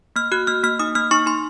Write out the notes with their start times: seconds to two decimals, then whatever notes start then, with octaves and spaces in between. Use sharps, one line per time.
0.16 A#3 F6
0.32 F#4 F#6
0.47 A#3 F6
0.63 A#3 F6
0.79 D#4 D#6
0.95 A#3 F6
1.11 D#4 C#6
1.26 D#4 C6